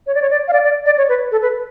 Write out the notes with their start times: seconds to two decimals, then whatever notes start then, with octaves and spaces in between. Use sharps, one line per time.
0.07 C#5
0.15 D5
0.22 C#5
0.30 D5
0.48 F5
0.53 D5
0.64 D5
0.86 D5
0.98 C#5
1.09 B4
1.32 A4
1.42 B4